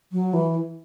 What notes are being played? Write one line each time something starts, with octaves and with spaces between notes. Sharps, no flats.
F#3
E3